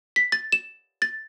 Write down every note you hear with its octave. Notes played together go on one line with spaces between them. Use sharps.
B6
A6
E7
A6